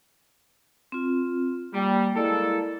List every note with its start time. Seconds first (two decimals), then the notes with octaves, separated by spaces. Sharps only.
0.92 C4 F4
1.74 G3 A#3 G5
2.16 G#3 A#3 E4 A4 D5